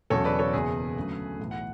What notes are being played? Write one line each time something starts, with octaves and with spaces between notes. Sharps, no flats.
E1 E2 C#3 F#3 A4 C#5
B4 D5
A4 C#5
F#1 E2 B2 G#4 B4
D2 C#3 F#3 A3
B1 A2 E3
F#5